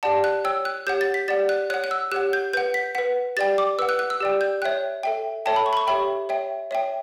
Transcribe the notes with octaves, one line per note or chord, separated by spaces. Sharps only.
G4 D5 F#5 A5
F#6
C#5 G5 E6
F#6
G4 C#5 F#5 G6
A6
B6
G4 D5 F#5 A6
F#6
C#5 F#5 F#6
F#6
E6
G4 C#5 F#5 F#6
G6
B4 F#5 G6
B6
B4 F#5 B6
G4 D5 G5 A6
D6
B4 F#5 E6
F#6
F#6
E6
G4 D5 G5
G6
C#5 E5 G5 F#6
A4 E5 G5
A4 C#5 E5 G5 A5
B5
C#6
B5
C#6
G4 C#5 E5 G5 B5
C#5 E5 G5
C#5 E5 G5